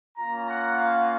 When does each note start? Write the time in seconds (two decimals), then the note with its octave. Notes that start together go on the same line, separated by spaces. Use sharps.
0.18 A#3 C#4 F4 A#5
0.47 F#5
0.77 F5